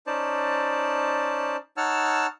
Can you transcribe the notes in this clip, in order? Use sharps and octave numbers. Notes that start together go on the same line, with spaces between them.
C#4 D#4 C5 D5 A5
D#4 C#5 F#5 A5 E6 F6